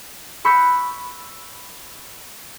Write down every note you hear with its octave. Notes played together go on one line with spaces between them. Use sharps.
B5 C#6 E6 F#6 G6 B6